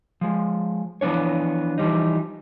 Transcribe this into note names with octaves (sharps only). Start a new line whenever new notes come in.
F3 G#3
E3 F3 B3 D4 C#5
E3 F3 G3 D#4